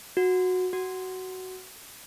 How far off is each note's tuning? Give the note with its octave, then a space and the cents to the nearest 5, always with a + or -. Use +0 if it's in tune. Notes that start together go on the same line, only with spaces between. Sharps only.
F#4 -15
F#4 +10